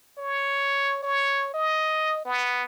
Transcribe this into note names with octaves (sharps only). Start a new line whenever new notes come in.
C#5
C#5
D#5
B3